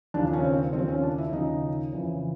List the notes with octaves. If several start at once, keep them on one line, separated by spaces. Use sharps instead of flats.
D#2 C#3 F3 D4
C#4
C4
D#2 C#3 F3 C4
C#4
D4
E4
D#2 C#3 F3 D#4
F2 C#3 E3